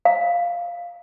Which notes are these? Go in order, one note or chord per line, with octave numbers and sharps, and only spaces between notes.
F5